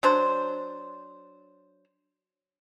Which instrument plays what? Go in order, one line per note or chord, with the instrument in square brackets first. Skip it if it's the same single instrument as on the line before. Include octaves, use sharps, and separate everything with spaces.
[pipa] F#3 D4 C5